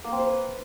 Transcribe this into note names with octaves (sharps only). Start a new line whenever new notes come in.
A#3
C4
C5
B4